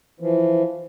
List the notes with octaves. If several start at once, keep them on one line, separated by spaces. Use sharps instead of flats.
E3 F3